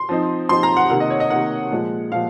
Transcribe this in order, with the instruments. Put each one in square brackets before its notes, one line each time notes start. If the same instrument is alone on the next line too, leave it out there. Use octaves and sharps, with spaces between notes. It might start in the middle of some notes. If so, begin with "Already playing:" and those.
Already playing: [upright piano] C6
F3 C4 D#4
F3 C4 D#4 C6
A#5
F#5
C3 D#3 A#3 F#5
D#5
C#5
D#5
C3 D#3 A#3 F#5
A#2 F3 G#3
A#2 F3 F5